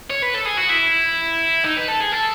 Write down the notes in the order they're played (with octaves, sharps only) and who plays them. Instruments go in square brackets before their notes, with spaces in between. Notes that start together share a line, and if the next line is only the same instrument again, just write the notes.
[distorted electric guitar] C#5
B4
A4
G#4
F#4
E4
D#4
B4
A4
G#4
A4